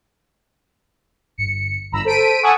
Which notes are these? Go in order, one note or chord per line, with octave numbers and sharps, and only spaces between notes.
G1 C#7
G1 A#5 B5 E6
A4 C5 B6 D7 D#7
F#5 G#5 A5 C#6 D#6 E6